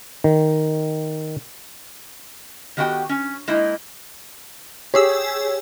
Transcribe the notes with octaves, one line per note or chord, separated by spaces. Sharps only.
D#3
D#3 B3 F#4 G4 F#5 G5
C#4
G#3 A#3 D#4 E4 A#4
G4 G#4 C#5 E6